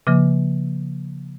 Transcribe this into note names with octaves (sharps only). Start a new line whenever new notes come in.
C#3 F3 A#3